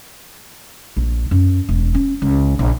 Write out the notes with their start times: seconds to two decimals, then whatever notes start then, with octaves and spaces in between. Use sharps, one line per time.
0.97 A#1
1.31 F#2
1.69 E1
1.95 C#4
2.22 C#2
2.59 A#1